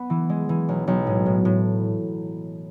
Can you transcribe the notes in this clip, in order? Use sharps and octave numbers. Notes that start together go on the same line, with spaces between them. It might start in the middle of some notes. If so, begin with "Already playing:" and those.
Already playing: B3
E3
G#3
E3
B1
B1
A2
A2
A2